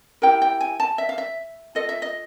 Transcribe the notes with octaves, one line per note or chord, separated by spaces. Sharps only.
E4 G4 A#4 G5
G5
G#5
A5
E5
F5
E5
F4 A4 D#5
E5
D#5